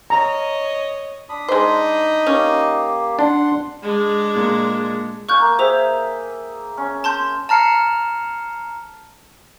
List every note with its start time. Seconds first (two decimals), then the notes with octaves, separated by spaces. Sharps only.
0.10 C#5 D#5 A#5
1.29 D4 B5 D#6
1.48 G#3 D#4 C5
2.27 A#3 C#4 G4
3.19 D4 F#5 C6
3.83 G#3 D4
4.35 A#2
5.29 F5 G#5 C#6 F#6 G6
5.40 A#3
5.59 G#4 C5 E5 G5 F7
6.77 C#4
7.04 A5 C6 G6
7.49 A5 A#5 F6 C7 C#7